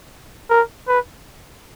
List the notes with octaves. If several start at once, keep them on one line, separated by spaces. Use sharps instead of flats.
A#4
B4